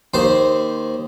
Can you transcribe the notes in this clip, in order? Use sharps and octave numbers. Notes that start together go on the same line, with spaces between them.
D#2 C5